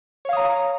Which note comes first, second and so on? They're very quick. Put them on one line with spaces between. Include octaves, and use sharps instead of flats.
C#5 F5 D#6 A#5